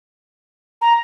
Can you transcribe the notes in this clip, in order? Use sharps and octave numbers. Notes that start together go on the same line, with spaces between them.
A#5